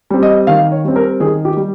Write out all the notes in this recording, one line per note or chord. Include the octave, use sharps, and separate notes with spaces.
G3 C4
D#5
D#3 F5
C#5
G3 C4
A#4
D#3 G#4
G4
G3